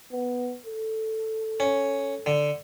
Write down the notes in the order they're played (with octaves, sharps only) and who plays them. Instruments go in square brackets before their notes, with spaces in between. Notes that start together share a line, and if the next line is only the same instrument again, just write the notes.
[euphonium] B3
A4
[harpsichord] C#4
D3